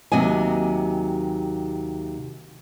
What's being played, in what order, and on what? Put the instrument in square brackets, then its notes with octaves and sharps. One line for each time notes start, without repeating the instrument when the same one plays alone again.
[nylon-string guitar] D#2 C3 F#3 D#5 G#5